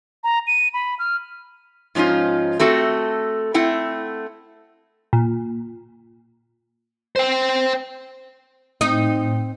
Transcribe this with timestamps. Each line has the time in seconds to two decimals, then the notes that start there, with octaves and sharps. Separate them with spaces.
0.24 A#5
0.47 D#7
0.74 B5
0.99 F6
1.95 G#2 F3 C#4 D#4 F4
2.59 A3 C4 F#4 A4
3.54 A3 C4 E4 F#5 G5
5.13 A#2
7.16 C5 G5
8.81 A2 C4 D#4 D#5